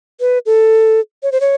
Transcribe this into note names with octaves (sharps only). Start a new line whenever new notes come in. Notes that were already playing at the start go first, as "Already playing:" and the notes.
B4
A4
C#5
C5
C#5